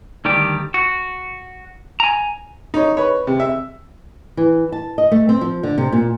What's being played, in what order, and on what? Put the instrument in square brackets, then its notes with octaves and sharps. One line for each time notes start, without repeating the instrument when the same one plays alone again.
[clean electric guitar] D2 D#3 G3 G4
F#4
G#5 A#5
[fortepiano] D#4 C#5
B4 C#5
C3
E5
[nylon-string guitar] E3
A5
D#5
A3
C4
F3
D3
C3
A#2